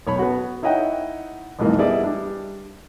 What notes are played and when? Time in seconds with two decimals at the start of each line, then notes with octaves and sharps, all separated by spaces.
0.06 B1 C#5 B5
0.19 B3 F#4
0.63 D#4 E4 C#5 D#5 F#5 G5
1.59 B1 F2 G#2 E3 A#3
1.78 G3 B3 E4 G#4 D5 D#5
2.04 G3 D4